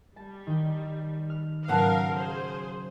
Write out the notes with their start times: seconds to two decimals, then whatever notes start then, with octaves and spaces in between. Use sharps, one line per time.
0.16 G3 A5
0.47 D#3 G5
1.30 F6
1.68 G#2 C#3 F#3 A#4 B4 F5 F#5 A5
2.15 G#4 C5